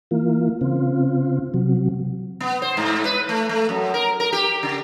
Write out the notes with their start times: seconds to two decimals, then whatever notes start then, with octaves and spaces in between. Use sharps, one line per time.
0.11 E3 A#3 F4
0.61 C#3 C4 F4
1.54 C3 F#3
2.40 B3
2.62 C5
2.77 G#2
3.05 B4
3.29 A3
3.49 A3
3.69 F#2
3.94 A#4
4.20 A#4
4.32 G4
4.63 C#3